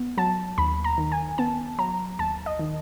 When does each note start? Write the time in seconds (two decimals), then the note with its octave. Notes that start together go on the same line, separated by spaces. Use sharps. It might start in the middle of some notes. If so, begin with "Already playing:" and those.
Already playing: B3
0.17 F#3 A5
0.58 D#2 B5
0.84 A#5
0.98 D#3
1.12 G#5
1.38 B3 A5
1.78 F#3 A#5
2.19 D#2 A5
2.46 D#5
2.59 D#3